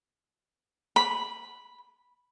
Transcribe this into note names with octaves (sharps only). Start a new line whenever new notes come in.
B5